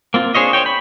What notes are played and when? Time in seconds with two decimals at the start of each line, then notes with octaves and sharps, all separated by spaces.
0.14 A#3 C4 F4
0.35 D4 G#4 C5 C#5 D#5
0.53 C5 C#5 G5
0.66 B5